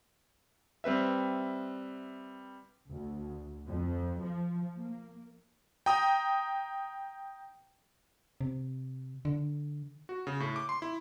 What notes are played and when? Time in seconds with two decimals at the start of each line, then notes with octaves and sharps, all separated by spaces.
0.84 G3 C4 B4 E5
2.90 D2
3.67 F2
4.21 F3
4.77 A#3
5.86 G5 A#5 D#6
8.41 C3
9.25 D3
10.09 F#4
10.27 C#3
10.40 A2
10.56 D6
10.69 C6
10.82 E4